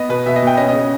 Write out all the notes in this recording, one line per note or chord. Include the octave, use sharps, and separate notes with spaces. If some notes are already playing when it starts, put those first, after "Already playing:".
Already playing: B3 D#5
B2 B4
B2 E5
D#5
B2
G5
C#4 D#5
D#5
C#3